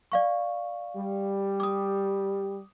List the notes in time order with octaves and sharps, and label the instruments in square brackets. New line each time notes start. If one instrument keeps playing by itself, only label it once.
[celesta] D5 F5 C#6
[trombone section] G3
[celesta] D6 D#6